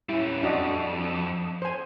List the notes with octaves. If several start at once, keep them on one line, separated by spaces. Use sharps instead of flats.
G3 C#4 E4
F2 D4 F#4 D#5
C5 G#5